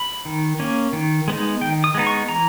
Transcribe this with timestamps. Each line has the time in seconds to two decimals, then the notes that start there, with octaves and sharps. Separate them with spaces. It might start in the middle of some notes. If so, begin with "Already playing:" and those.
Already playing: B5
0.25 D#3
0.60 A#3 C#4
0.93 D#3
1.28 G#3 B3 D#4
1.61 D#3 G5
1.84 D#6
1.94 G#3 B3 D#4
2.07 C#6
2.29 E3 A#5